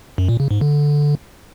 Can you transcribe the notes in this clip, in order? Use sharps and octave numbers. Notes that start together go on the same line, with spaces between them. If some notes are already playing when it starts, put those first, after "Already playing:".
F#2
A#2
C#3
G#2
D3